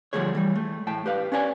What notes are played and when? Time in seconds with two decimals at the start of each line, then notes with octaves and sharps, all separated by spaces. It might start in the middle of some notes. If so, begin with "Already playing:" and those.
0.13 D3 F3 G3 A3 G#4 C#5
0.35 E3 G3
0.56 A3
0.87 A2 G5 A5
1.06 G4 B4 F5
1.32 C#4 B4 D5 G#5